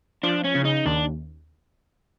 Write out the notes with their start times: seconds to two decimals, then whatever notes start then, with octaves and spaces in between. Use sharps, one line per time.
0.23 F3 D4
0.44 C#4
0.55 C#3
0.65 D#4
0.86 D#2 D4